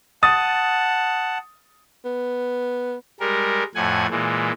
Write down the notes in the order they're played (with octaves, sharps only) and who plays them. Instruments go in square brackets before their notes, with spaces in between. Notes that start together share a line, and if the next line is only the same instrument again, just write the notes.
[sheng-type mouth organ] F#5 A5 [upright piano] D#6 A6
[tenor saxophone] B3
[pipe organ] G3 G#3 A#4
F2 A2 F#5 G#5
A#2 E3 G#3